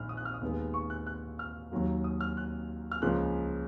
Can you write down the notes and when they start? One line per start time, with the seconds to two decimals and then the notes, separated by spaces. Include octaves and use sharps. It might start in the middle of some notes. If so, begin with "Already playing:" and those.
Already playing: A#1 D#3 F6
0.09 D#6
0.17 F#6
0.25 F6
0.34 D#6
0.41 D#2 D#3 G#3 B3
0.74 C#6
0.90 F#6
1.07 F#6
1.39 F6
1.72 D#2 D#3 F#3 A#3
2.04 D#6
2.21 F6
2.37 F#6
2.92 F6
3.02 C#2 C#3 F3 A#3 F#6